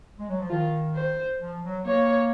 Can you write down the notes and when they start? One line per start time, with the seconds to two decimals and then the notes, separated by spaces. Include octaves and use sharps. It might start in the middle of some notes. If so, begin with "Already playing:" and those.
0.19 G#3
0.29 F#3
0.39 F3
0.50 D#3 F4
0.95 C5
1.41 F3
1.64 F#3
1.85 A#3 C#5